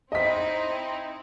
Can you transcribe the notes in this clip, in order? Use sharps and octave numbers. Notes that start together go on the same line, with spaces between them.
C4 D#4 E4 D#5 B6